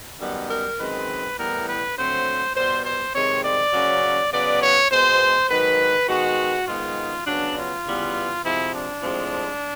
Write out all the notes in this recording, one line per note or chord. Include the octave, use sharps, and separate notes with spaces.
F#2 D#3 G3 B3
A#4
F#2 D#3 G#3 C4 B4
A2 E3 G3 B3 A#4
B4
D3 F#3 A3 C4 C5
B2 G3 B3 C5
C5
C3 D#3 G#3 C4 C#5
D5
C#3 F#3 A#3 C#4
C#3 F#3 B3 D5
C#5
B2 G#3 B3 C5
G#2 D#3 F#3 B4
D#3 G#3 B3 F#4
G#2 D#3 G#3 B3 F4
C#3 F#3 B3 D4
F4
C#3 E3 G3 B3
C3 F3 G#3 C4 E4
D4
A2 F3 G#3 C4